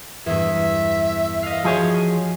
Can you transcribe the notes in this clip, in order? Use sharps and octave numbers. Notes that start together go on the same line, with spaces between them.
E2 G2 E5
D#5 F5
F3 F#4 G#4 C#5